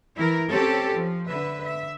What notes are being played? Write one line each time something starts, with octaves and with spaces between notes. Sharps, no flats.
E3 E4 A#4
C4 C#4 G4 A4 C#5
F3
D3 B4 E5
E5